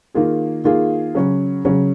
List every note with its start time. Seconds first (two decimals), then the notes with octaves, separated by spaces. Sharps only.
0.14 D#3 A#3 F4 G#4
0.64 D#3 A#3 F4 G#4
1.15 C#3 F#3 C#4
1.65 C#3 F#3 C#4